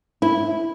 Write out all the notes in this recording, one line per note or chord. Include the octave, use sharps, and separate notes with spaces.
E4